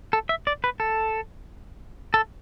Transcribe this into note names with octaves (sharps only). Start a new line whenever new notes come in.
A4
E5
D5
B4
A4
A4